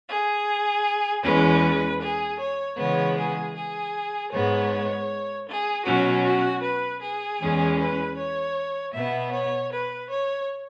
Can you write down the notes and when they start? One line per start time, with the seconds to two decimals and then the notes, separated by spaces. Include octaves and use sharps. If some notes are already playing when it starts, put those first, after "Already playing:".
0.08 G#4
1.23 E2 E3 G#3 C#4 B4
2.00 G#4
2.39 C#5
2.77 C#3 E3 G#3 B3 C#5
3.16 G#4
3.55 G#4
4.31 G#2 G#3 B3 C#5
5.46 G#4
5.85 B2 F#3 C#4 F#4
6.23 F#4
6.62 B4
7.01 G#4
7.40 E2 E3 G#3 C#4
7.78 B4
8.16 C#5
8.93 B2 B3 E5
9.31 C#5
9.71 B4
10.09 C#5